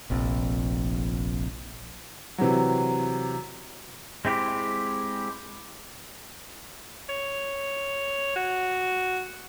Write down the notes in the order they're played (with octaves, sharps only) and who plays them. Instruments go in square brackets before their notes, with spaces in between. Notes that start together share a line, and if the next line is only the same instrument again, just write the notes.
[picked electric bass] F1 A#1 F2
[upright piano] C3 E3 F#3
[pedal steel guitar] G#3 C4 E4 G4
[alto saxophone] C#5
F#4